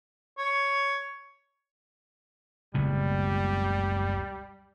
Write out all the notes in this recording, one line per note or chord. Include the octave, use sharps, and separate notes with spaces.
C#5
F#1 C#2 B2 G3